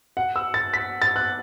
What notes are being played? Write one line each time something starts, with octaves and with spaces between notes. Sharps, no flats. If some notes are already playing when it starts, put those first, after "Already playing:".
F#5
E6
A6
B6
A6
F#6